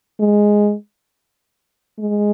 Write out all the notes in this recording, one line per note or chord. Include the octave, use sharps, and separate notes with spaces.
G#3
G#3